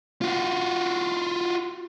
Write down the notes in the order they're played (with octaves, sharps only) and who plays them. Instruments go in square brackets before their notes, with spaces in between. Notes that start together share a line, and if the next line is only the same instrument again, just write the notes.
[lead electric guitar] F4 F#4